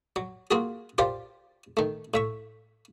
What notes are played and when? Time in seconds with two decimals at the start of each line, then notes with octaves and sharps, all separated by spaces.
0.16 F#3
0.51 A#3 F4 F#4 G#4
0.98 F4 G4 A#4 C5 D5
1.77 D#3 A3
2.14 A2 E5 C#6